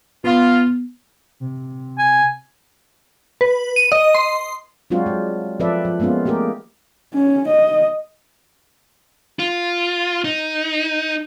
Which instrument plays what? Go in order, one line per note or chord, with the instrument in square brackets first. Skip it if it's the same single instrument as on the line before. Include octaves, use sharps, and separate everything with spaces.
[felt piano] B3 [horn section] F4
[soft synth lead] C3
[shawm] G#5
[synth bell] B4
D#7
D#5
C6
[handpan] F#3 G#3 C4 D4 F4 F#4
G3 G#3
F3 C4 A4 B4 D5 E5
F3
G#3 A#3 B3 C#4 F4
A3 A#3 G4 G#4 A#4
[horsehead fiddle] C#4
D#5
[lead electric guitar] F4
D#4